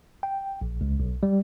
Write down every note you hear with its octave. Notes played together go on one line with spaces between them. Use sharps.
G5
A#1
C#2
B1
G3